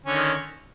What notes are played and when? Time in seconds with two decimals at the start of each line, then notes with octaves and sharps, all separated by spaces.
0.04 D3
0.06 C#4
0.09 D#3